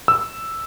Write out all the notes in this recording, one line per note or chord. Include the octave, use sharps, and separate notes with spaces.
E6